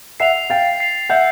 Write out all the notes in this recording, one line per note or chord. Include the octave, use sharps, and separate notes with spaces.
E5 F#5 C7 F7
F5 G5 A6
C7 F7
E5 F#5 G6